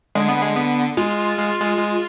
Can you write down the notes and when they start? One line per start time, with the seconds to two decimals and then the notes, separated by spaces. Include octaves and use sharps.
0.15 D3 G#3
0.28 B3
0.42 G#3
0.56 B3
0.97 G#3 F4
1.38 G#3
1.61 G#3
1.78 G#3